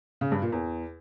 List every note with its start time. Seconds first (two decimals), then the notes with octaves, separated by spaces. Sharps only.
0.21 C#3
0.32 G2
0.42 A#2
0.52 E2